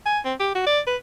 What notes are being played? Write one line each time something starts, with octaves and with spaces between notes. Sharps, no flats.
G#5
C4
G4
F#4
D5
B4